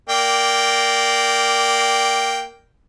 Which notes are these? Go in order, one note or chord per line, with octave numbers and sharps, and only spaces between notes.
A#3 D5 G5